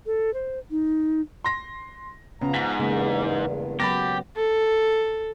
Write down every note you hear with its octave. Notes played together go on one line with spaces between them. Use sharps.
A4
C5
D#4
C6 A#6
C#3 F3 B3 A#5
G#2 B6
E2 G2 C#3 G#3 A#3
F#3 B3 G4 B5 A6 A#6
A4